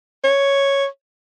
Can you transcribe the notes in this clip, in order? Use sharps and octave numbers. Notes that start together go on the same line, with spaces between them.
C#5